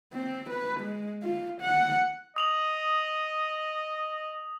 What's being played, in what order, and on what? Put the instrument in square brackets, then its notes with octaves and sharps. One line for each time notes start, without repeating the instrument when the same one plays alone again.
[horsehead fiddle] C4
B4
G#3
F4
F#5
[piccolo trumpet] D#5 [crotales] D#6 F7 F#7